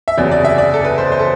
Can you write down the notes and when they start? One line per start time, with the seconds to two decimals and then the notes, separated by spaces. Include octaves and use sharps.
0.08 E5
0.17 F#1 E2 C3 F#3 D5
0.31 D5
0.45 E5
0.58 D5
0.74 A4
0.85 B4
0.98 C5
1.12 C5
1.19 A4